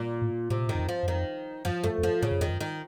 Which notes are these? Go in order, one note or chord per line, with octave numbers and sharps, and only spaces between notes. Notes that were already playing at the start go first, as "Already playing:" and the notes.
Already playing: A#2
A2
A2 C3
A#2
A2
D#3
F#2
F2
F3
F#2
F2 D#3
F#2 F3
F#2 A3
F2
F#2 F3
A2 C#3
F#2
F2 D#3
F#2
D#3